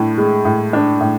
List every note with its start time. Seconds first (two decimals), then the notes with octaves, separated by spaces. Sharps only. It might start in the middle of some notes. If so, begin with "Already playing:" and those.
Already playing: A2 D4 E4
0.18 G#3
0.45 A2
0.73 D4
1.01 A2